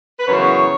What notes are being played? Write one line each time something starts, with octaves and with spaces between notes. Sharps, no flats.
B4
F#2 C#3 E3 B3 C#5